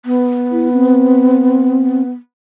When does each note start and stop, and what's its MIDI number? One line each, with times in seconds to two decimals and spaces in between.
0.05 2.10 59
0.52 0.71 64
0.73 2.03 60